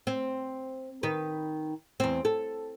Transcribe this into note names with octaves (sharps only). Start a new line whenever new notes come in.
C4
D#3 B4
E2 C4
A4